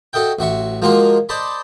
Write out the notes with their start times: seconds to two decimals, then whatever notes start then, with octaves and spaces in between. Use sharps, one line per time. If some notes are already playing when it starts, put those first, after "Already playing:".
0.13 F#4 A4 D#5 E5 G5
0.39 A1 F#4 E5 C#6
0.82 F3 G#3 A#3 F4 F#4
1.29 C5 D5 D#5 A5 B5